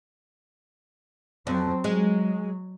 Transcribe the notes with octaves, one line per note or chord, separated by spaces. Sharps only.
F2 F#3 C4
F#3 G#3